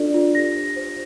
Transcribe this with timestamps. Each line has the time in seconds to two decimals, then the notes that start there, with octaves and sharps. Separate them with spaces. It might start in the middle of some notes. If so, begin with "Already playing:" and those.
Already playing: D4 F4 A4 D5
0.14 F4
0.35 G4 A#6
0.56 C5
0.76 C5